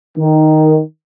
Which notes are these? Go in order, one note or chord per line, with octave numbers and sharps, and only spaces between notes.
D#3